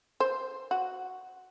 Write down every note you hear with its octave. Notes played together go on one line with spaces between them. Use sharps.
C5
F#4